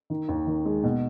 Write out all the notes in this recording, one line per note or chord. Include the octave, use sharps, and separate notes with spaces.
D#3
D#2
D#3
G#3
B2